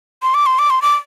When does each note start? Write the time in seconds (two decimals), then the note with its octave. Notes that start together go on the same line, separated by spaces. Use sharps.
0.23 C6
0.34 D6
0.46 C6
0.59 D6
0.70 C6
0.82 D6